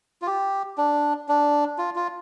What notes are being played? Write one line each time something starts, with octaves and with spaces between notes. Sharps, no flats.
F4
G4
D4
D4
F4
F4